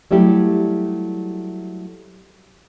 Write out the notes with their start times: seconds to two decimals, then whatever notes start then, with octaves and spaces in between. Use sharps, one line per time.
0.11 F#3 G3 A3 E4 G4